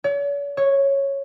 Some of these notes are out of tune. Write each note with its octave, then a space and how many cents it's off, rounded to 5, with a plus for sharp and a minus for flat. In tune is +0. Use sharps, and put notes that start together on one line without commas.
C#5 +45
C#5 -5